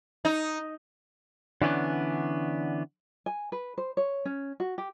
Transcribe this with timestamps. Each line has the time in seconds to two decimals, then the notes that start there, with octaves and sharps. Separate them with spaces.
0.25 D#4
1.62 D3 E3 B3 C#4 D4
3.26 G#5
3.52 B4
3.78 C5
3.97 C#5
4.25 C#4
4.60 F#4
4.78 G4